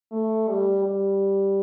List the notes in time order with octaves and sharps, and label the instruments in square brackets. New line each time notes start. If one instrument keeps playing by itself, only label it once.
[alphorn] A3
G3
G3